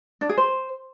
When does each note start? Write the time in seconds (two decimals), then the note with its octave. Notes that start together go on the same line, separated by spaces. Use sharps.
0.21 D4
0.29 G#4
0.38 C5